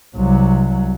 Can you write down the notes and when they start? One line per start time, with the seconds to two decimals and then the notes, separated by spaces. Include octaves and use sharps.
0.16 C2 F#3